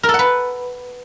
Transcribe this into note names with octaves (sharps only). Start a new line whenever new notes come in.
A#4
A4
F#5
B4